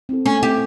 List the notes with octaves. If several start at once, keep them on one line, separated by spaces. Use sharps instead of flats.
C4 E4 A4
A3 C#4
C4 E4 G4 A4